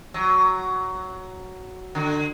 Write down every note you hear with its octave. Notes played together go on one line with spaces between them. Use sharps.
F#3
D3